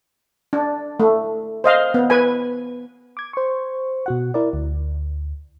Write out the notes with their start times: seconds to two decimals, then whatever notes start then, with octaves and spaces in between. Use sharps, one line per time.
0.53 D4
1.00 A3
1.64 C5 D#5 F5
1.94 B3
2.10 B4 G#5
3.17 D6 G#6
3.33 C5 C#6
4.06 B2 F#4 F#5
4.34 E4 A#4 D5
4.53 D2